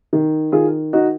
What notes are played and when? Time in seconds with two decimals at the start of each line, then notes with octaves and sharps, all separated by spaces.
0.13 D#3
0.52 D#3 F4 G#4
0.93 D#4 F#4